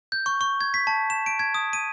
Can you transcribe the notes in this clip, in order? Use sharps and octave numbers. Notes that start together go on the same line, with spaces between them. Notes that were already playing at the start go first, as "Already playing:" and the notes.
G6
C#6
C#6
G#6
B6
A5
E7
D7
G#6
D#6
D#7